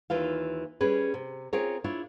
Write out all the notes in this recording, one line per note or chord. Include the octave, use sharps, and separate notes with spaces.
D#2 E3 F4 F5
G3 C#4 G#4 B4
C3
C4 C#4 F4 G#4 A#4 C#5
D4 E4 F4 C#5